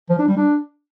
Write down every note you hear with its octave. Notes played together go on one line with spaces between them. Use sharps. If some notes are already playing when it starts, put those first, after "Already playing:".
F3
D4
G3
D4